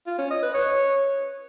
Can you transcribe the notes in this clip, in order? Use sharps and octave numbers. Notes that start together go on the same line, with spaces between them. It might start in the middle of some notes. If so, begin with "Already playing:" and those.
F4
C#4
D#5
B4
C#5